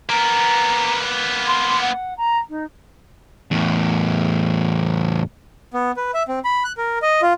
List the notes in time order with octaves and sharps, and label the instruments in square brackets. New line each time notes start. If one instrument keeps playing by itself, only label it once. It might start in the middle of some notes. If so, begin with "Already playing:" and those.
[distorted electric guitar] A#3 B3 [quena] A#5
[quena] C6
F#5
A#5
D#4
[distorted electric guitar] E2 A2
[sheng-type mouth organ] B3
B4
E5
C4
B5
F#6
A#4
D#5
F4